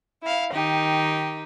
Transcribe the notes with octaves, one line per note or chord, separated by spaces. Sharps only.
E4 F5
D#3 D#4 G4